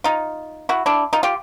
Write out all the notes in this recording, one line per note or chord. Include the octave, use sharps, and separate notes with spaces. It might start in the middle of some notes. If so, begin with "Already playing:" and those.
D#4 F4
E4 F#4
D4 E4
D#4 F4
F4 G4